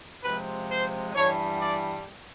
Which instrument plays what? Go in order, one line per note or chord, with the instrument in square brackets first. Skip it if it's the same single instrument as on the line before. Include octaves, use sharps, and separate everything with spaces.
[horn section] C3 F3 G#3 B4
C5
G2 E3 G3 C#5
D5